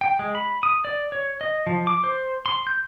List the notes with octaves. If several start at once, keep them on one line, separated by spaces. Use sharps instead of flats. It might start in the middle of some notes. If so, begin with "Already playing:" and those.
G5
G#3
B5
D#6
D5
C#5
D#5
F3
D6
C5
C6
G6